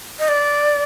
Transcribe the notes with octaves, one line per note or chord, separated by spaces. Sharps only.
D#5
D5